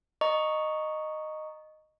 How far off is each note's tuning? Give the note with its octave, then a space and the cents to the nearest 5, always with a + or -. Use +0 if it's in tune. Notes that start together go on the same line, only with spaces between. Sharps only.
D#5 -10 A#5 +0 C#6 +0